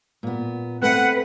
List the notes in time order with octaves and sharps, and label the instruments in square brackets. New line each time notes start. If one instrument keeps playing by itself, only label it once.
[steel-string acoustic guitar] A#2 B3
[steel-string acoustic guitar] A3 C4 [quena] B4 [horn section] F#5